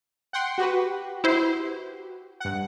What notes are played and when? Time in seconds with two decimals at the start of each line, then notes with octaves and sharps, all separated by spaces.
0.33 F#5 G5 C6
0.58 F#4 G4 B4
1.24 E4 C5
2.40 G2 F#5